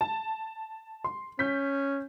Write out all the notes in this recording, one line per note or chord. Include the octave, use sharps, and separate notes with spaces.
A5
C6
C#4 G6 B6